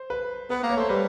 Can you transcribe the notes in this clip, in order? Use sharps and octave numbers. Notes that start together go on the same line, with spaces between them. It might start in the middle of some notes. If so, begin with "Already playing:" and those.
Already playing: C5
B4
B3 B4
A#3
C#5
A3 C5
G3 B4